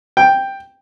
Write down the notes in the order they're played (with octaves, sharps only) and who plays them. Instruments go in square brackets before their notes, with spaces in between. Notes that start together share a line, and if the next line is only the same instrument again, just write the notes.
[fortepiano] G5